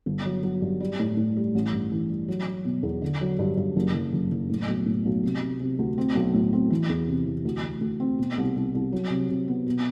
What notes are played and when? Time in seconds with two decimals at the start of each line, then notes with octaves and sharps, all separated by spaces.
0.06 G1
0.25 F#3
0.43 F#3
0.62 G2
0.80 G3
1.00 A2
1.17 A2
1.37 G3
1.55 A1
1.73 G2
1.92 E3
2.09 G3
2.28 F#3
2.47 F#3
2.65 B2
2.83 E2
3.02 D3
3.21 F#3
3.39 G2
3.57 G2
3.76 F#1
3.94 F#1
4.13 F#1
4.31 F#1
4.50 A2
4.68 B1
4.86 A2
5.05 B1
5.23 C3
5.41 C3
5.60 C3
5.79 D2
5.98 C4
6.15 B1
6.34 A2
6.53 C4
6.70 E3
6.89 E2
7.08 C3
7.27 E3
7.45 D2
7.63 D2
7.81 D2
8.00 C4
8.19 B2
8.38 C2
8.56 C2
8.75 C2
8.92 F#3
9.10 C3
9.30 C3
9.48 B3
9.67 B2